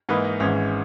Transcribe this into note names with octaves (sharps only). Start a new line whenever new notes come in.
G#2 E3 A#3 D#4 B4
D#5
G#1 G#2 E3 G#3 C#4